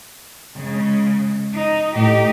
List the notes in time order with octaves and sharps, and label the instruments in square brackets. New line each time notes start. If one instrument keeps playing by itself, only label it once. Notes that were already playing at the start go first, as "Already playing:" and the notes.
[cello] C#3 G#3
D#4
[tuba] A2 [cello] D#4 G4